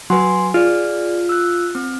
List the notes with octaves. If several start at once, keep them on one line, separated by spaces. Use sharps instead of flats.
F#3 B4 G#5 C6
F4 G#4 D5
E6 F#6
C4